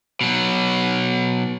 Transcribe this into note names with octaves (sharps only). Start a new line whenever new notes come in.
B2 F#3